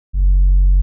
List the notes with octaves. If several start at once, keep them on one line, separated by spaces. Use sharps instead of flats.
F#1